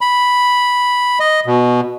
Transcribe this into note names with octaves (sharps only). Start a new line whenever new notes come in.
B5
D#5
B2